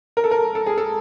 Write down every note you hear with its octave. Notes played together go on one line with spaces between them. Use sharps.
A#4
A4
A#4
A4
G#4
A4